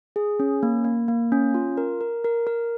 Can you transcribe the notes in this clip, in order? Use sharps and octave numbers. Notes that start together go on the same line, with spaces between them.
G#4
C#4
A#3
A#3
A#3
C#4
F4
A#4
A#4
A#4
A#4